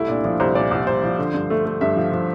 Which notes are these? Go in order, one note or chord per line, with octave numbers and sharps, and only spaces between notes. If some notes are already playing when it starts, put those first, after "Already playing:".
Already playing: C2 A3 E4
A#2 D4
F3 D4
C2 C5
A#2 D5
C2
C2 C5
F3
D3
G2
A3
A3
G2 E5
F3
F3